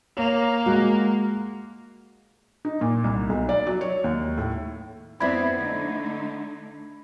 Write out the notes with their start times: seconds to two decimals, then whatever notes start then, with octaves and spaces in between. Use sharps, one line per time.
0.17 A#3 C#5
0.66 G#3 F#4
2.65 D#4
2.81 A#2
3.04 C2
3.29 B1
3.49 D5
3.67 F#3
3.81 C#5
4.04 D#2
4.38 A2
5.20 F2 B3 C4 D4 E4 B5 G#6
5.59 D3 A3 D#4